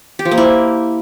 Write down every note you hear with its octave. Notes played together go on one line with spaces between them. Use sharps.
G4
F3
A#3
E4